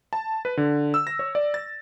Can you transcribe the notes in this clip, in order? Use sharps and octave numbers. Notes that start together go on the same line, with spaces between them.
A5
B4
D3
E6
A#6
C#5
D5
A6